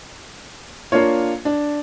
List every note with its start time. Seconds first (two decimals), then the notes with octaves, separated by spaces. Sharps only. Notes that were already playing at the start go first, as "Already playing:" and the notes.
0.92 A#3 D4 F4 C#5
1.45 D4